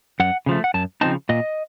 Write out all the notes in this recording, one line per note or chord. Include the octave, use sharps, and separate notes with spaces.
F#2 F#5
C#3 F3 A3
F#5
F#2 A5
C#3 F3 C4 D#4 A5
A#2 D#5